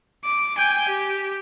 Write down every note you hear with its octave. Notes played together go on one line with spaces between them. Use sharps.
D6
G5 G#5
G4